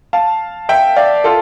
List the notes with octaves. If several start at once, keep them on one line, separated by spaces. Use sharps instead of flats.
F5 A5
E5 G5
D5 F5
F4 A4